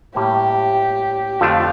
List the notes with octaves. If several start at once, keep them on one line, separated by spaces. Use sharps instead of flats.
A2 G3 A#3 G4
F2 D3 F3 A3 D4 F4